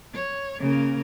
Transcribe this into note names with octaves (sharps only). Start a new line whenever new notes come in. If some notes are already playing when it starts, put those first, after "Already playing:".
C#5
C#3 A#3